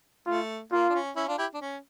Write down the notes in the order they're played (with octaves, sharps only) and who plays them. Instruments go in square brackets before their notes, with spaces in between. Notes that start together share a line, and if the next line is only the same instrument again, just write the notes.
[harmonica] A3 [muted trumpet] F4
[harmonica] A#3 [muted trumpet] F4
[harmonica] D4
C#4
C#4 E4
D4 F4
E4 G4
D4
C#4